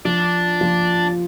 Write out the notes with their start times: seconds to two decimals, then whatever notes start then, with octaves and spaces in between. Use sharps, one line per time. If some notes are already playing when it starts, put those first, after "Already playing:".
0.05 F3 D4
0.61 F3